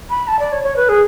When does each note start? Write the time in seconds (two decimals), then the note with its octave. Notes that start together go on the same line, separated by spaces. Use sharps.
0.10 B5
0.28 A5
0.39 D5
0.52 C#5
0.64 C#5
0.76 B4
0.89 G#4